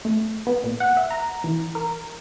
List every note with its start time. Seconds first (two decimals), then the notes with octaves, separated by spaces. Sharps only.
0.05 A3
0.47 B3
0.64 A#2
0.80 F#5
0.97 E5
1.11 A#5
1.44 E3
1.75 A#4